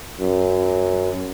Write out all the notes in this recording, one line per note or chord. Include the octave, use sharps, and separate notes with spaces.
F#2